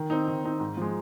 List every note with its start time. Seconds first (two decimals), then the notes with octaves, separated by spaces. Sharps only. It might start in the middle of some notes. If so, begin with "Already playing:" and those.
Already playing: D#3
0.10 C4 D#4
0.28 D#3
0.44 C4 D#4
0.60 G#2
0.77 F3 G#3